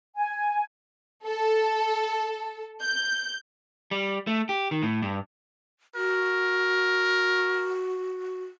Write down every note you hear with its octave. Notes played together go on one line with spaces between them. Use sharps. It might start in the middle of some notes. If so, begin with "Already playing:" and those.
G#5
A4
G6
G3
A3
G4
D#3
A2
G2
F#4 A#4